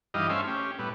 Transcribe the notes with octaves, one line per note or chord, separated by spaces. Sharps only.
G2 E3 D#4 G4 D#5 F5
A3 C#4 C5 E5 F5 G#5
C#4 G4
A2 G3 B3